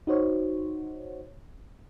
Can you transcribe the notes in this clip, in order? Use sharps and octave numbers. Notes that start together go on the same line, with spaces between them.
D#4 F#4 C5 C#5